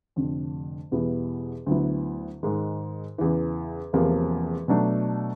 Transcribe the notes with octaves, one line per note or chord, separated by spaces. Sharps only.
F1 F2 D3
E2 B2 G3 B3 E4
D2 D3 F#3 B3 E4
G#2 D#3 G#3
E2 C#3 E3
E1 E2 C3 F3 A#3
B2 F#3 A3 D4